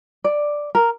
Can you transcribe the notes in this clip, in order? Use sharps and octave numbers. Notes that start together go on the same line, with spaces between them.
D5
A#4